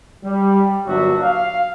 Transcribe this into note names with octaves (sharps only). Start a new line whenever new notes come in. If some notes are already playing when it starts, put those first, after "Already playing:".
G3
G1 A#2 F#3 D4 F#4 E5
F5